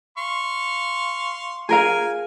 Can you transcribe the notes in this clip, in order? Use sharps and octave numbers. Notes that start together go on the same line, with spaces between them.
F5 C6 C#6
G#4 A#4 F5 G#5